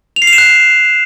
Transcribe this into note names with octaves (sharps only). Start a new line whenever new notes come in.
F7
C7
F7
E7
F#6